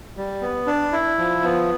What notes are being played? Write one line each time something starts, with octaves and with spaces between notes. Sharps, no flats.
G3
B3
D4
E4
F3
B3